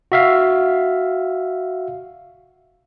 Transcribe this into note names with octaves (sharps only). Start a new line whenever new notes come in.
F#4 E5 F5